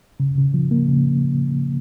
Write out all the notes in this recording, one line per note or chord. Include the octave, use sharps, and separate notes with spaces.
C#3
C#3
F3
A#3
C#3